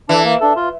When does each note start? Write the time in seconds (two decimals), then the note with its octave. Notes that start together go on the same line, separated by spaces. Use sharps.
0.09 E3 D4 A4
0.24 A#3
0.41 D4 A4
0.56 F4